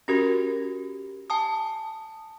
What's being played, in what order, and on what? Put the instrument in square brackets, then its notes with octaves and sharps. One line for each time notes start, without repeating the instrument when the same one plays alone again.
[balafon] C#4 F#4 A#4 [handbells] G4 A#6
[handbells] G#5 A5 D#6